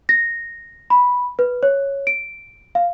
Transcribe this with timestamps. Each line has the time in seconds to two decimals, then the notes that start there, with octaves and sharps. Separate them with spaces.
0.09 A#6
0.90 B5
1.39 B4
1.63 C#5
2.07 D7
2.75 F5